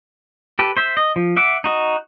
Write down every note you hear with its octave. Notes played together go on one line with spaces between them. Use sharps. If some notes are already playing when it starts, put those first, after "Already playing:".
G4 A4 B4
C5 E5
D#5
F3
E5 F#5 D6
D#4 F#4 D#5